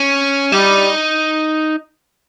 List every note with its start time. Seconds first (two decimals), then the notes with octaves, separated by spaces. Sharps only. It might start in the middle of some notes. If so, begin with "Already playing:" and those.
Already playing: C#4
0.52 G3 D#4